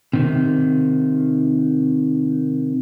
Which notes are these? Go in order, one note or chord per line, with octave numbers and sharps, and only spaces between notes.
C3 D#3